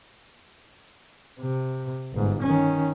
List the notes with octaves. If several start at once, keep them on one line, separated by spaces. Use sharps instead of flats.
C3
G1 G#2
D#3 C#4